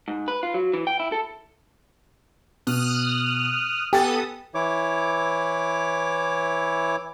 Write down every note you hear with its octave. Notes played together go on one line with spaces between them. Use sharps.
G#2
B4
F4
F#3
E3
G5
E4
A4
B2 D#6 F6 F#6
B3 G4 A4 G#5 D#6 A6
E3 E4 C#5 D6